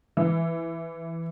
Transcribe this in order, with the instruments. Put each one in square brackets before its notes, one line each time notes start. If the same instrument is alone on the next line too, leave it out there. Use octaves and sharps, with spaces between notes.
[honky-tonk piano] E3